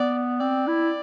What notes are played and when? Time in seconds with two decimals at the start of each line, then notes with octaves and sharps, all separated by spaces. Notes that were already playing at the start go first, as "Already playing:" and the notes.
Already playing: B3 D5
0.40 C4 D5
0.67 E4